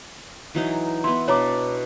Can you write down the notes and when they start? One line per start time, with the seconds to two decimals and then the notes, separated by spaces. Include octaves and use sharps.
0.55 E3 F#3 D#4
1.04 B3 E4 C6
1.28 B2 D4 C#5 D5 A#5 D6